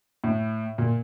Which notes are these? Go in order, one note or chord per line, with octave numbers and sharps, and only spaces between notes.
A2
A#2